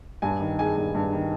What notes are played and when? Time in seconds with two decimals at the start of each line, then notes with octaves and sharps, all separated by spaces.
0.22 G2 G#5
0.40 D#3
0.59 G#3 G#5
0.77 G2
0.95 G2
1.13 D#3